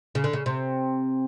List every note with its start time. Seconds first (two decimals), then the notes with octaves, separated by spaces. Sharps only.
0.15 C#3
0.24 D3
0.33 C#3
0.46 C3